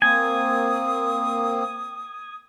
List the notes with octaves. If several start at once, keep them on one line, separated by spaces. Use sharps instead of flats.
A#3 C4 G#5 D#6